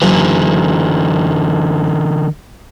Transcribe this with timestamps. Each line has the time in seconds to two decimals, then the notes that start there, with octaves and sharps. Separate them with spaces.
0.02 F#1 D3 E3